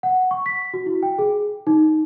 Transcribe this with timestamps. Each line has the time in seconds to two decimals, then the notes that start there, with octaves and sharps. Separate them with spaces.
0.03 F#5
0.31 C#6
0.46 B6
0.74 F#4
0.86 E4
1.03 G5
1.19 G#4
1.67 D#4